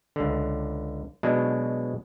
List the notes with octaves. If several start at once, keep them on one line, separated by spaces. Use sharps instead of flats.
C#2 D3
B2 F#3 G#3 D4